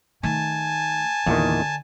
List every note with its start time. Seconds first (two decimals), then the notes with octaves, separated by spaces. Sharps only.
0.23 D#3 A3 G#5 A5
1.26 E2 A#2 D3 D#3